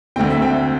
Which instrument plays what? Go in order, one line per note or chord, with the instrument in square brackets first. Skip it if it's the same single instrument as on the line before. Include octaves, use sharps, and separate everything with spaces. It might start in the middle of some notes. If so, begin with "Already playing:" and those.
[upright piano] D2 D3 A3 C4 G5
E5
G5